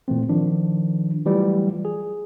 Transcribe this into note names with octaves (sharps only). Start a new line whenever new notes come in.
A#2 E3 A3 C4
D#3 F3 D4
E3 F#3 G3 A3 F4
G#4